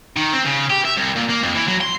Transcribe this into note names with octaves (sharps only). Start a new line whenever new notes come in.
D#3
C4
C#3
G4
E5
C2
A#2
A#3
F2
E3
F#3
C6